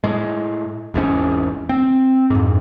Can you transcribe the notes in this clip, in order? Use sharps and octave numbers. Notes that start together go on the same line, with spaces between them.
A2 G#3
G#1 E2 G#2 C#4
C4
F2 G#2